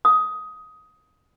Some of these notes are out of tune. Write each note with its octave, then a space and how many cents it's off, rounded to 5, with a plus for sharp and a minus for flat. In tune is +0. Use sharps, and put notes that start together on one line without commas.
D#6 +15